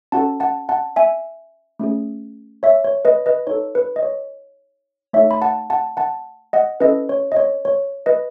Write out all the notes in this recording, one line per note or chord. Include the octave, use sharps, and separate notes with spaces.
C#4 F#4 A4 F#5 A5
F#5 A5
F#5 A5
E5 G#5
A3 C#4 G#4
C#5 E5
C#5
B4 D#5
B4 D#5
D#4 A4 C#5
B4
D#5
C#5
A3 D#4 A4 C#5 E5
B5
F#5 A5
F#5 A5
F#5 A5
D#5 F#5
C#4 E4 A4 B4 D#5
C#5
D#5
C#5
C#5
B4 D#5